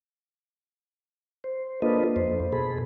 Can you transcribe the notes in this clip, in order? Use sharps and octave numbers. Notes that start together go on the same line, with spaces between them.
C5
A#3 D4 F4 A4 B4 D#5
F2 C5
B2 G#4 A4 B5